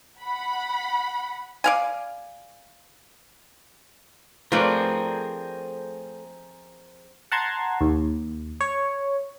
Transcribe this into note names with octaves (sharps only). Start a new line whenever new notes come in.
F#5 B5
D5 F5 G#5
F3 A3 C4 G#4 A#4 B4 D5
F#5 A5 A#5 C6 G#6
D#2
C#5